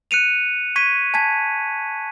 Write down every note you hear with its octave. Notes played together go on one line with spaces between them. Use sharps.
F#6 C#7 D#7 F7
C#6 G#6 B6 D#7
G#5 A5 G#6 B6